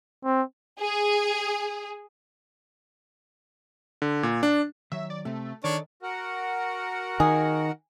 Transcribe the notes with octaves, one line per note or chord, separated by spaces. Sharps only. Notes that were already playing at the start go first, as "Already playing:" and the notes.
C4
G#4
D3
A#2
D4
D#3 F#3 C#5 E5
D5
C3 A3 C4
D#3 D4 A4 C#5 D5
F#4 A#4 F#5
D#3 G#4